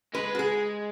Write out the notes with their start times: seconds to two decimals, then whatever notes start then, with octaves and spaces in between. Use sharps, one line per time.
0.14 G#3 B4
0.35 F#4
0.39 G#4